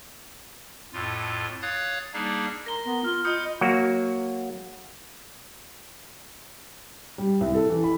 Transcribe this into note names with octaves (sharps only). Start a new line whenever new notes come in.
F2 A2 F4
C#5 F5 D#6 F#6 G#6 A6
G3 A#3 D4 D#4 G#4
A#4 A#5 C6 A#6 G7
B3
F4 F6 G7
F4 D#5 B5 D#6 G6 C#7
F#3 A#3 F#4
G3
C2
A4
E3
B5